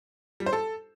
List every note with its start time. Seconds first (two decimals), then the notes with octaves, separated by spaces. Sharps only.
0.40 G3
0.46 C5
0.53 A4